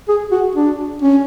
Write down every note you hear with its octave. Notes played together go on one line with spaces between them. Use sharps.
G#4
F#4
D4
C#4